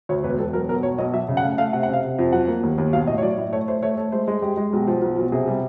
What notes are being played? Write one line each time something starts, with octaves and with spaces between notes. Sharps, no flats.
D2 C#5
E1 B4
E1 A4
F#3 A#4
B1 A#4
B1 C#5
B1 D#5
F#3 E5
C#3
F#5
A3 F5
A3 F5
C3 F#5
F#5
C3 F5
C3
F2
F#3 F#5
A#3
D#2
D#2
B1 F5
A2 D#5
C#5
F#3 D5
A2
A3 C#5
A3 C5
A3 C#5
A3
G#3 C5
G#3
G#3 G4
G#3
B1 G4
F3
B1
B1
C3 G#4
G3